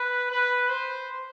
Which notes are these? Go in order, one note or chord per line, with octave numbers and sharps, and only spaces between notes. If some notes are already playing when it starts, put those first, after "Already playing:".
Already playing: B4
B4
C5